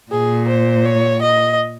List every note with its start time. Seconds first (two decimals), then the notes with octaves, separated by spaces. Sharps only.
0.12 A#2 G#4
0.49 C5
0.85 C#5
1.22 D#5